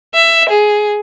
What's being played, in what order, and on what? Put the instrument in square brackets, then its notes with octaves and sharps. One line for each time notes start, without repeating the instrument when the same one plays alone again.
[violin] E5
G#4